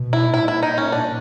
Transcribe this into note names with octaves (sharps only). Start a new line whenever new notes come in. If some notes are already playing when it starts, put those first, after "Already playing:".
Already playing: B2
E4
A#2 E4
E4
D#4
C#4
D4